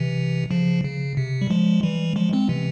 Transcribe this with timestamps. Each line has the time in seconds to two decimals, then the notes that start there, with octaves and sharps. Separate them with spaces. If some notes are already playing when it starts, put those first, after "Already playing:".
Already playing: C3 E3
0.51 C#3 F3
0.84 C#3
1.17 C3
1.41 G3
1.50 F3 G#3
1.83 E3 G3
2.16 F3 G#3
2.33 G#3 C4
2.49 C3 E3